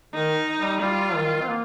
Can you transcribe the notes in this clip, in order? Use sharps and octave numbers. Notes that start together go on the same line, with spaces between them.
D#3 D#4
G3
G3 F4
D#3
C4
A#3